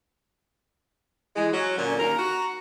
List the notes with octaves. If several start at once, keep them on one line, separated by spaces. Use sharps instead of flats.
E3 G#3
F#3 C#4 F#4
A#2 D3 F#3 C#4
D#2 A#4 A#5
F#4